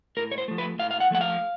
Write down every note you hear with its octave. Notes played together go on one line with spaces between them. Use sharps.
A2 A#4
C#5
C5
F3 A3
B4
A2 F5
F5
F#5
F3 A3 F#5
F5